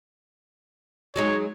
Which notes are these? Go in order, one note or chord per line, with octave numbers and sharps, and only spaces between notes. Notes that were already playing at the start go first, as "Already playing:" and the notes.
F#3 G#3 D#4 C#5